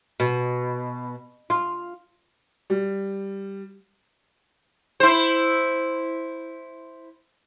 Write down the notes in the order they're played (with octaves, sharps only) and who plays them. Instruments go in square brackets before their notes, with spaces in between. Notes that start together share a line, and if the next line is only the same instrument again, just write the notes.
[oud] B2
F4
[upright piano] G3
[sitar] E4 C5